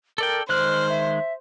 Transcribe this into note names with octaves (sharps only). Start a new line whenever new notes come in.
A4 A#4 D5 G5
D#3 G#3 C5 F6 F#6
E5